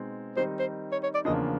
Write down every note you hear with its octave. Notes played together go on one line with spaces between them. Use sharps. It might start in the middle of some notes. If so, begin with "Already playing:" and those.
Already playing: B2 G#3 C4 D#4
D#3 G3 C4 D#4 C5
C5
C#5
C#5
D5
E2 C#3 F3 A#3 D4 D#5